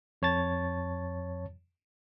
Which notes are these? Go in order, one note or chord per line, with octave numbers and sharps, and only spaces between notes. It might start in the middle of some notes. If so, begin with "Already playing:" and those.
F2 C#5 A5 A6